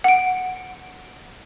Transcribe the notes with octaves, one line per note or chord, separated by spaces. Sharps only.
F#5 D7